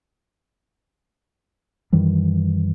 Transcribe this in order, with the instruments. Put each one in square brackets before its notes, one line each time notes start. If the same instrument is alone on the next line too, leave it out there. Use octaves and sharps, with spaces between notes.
[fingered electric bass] F#2 D#3 E3 G3